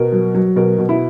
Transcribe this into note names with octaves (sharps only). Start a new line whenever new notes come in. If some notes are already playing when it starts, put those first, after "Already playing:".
Already playing: B2 A#4
F#3
F#3
B2 A#4
B2
E4